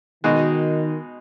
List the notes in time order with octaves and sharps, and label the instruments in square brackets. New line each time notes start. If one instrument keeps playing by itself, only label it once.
[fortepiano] B2 G#3 D#4 F#4 [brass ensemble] D#3